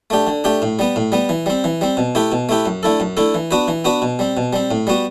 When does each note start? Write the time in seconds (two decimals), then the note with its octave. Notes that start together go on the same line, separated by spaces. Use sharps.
0.10 A3 D4 G4
0.27 D3
0.44 A3 D4 G4
0.62 A2
0.79 G3 B3
0.96 A2
1.12 G3 B3
1.29 E3
1.46 G3 C4
1.64 E3
1.81 G3 C4
1.97 B2
2.15 A3 E4 G4 B4
2.32 B2
2.49 A3 E4 G4 B4
2.66 F#2
2.83 D3 A3 E4 A4
3.00 F#2
3.17 D3 A3 E4 A4
3.34 E3
3.51 B3 D4 F#4 B4
3.68 E3
3.84 B3 D4 F#4 B4
4.02 B2
4.19 G3 C4
4.37 B2
4.53 G3 C4
4.71 A2
4.87 G3 B3 F#4